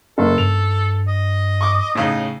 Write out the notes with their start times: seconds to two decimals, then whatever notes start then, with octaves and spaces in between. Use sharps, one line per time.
0.18 F#1 A4
0.38 G2 F7
1.08 D#5
1.61 C#6 D6
1.95 A2 C#3 D#4